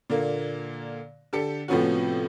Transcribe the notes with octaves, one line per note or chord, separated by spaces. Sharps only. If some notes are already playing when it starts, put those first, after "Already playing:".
A#2 D3 A#3
D3 G4 A4 C#7
A2 C3 F3 B3 C#4 F#4